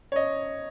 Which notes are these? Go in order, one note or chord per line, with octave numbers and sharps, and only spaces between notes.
C#5
D#5